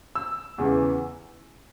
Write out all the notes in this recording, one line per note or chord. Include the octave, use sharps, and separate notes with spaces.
E6
E2 C#3 E3